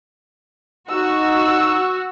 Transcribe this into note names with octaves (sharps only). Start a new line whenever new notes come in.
D#4 F#4 E6